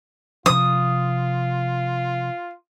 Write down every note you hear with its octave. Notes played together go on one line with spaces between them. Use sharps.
C3 F3 F4 D#6